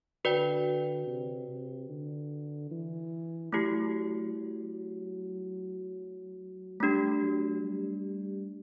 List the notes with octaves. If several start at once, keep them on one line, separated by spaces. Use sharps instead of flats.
D3 F#4 B4 D5 G5
C3
C3
D3
E3
F#3 A3 E4 G4
F#3
G3 A3 D4 G4
F#3
G3